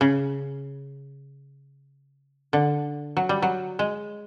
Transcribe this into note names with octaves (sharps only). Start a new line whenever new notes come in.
C#3
D3
F#3
G3
F#3
G#3